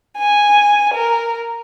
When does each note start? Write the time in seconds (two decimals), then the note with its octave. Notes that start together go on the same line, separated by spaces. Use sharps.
0.18 G#5
0.94 A#4